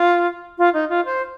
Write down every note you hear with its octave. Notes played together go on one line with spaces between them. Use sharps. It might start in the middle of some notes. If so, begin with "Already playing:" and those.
Already playing: F4
F4
D#4
F4
C5